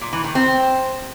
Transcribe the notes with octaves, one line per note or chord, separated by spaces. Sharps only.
A#2
E3
D#3
C4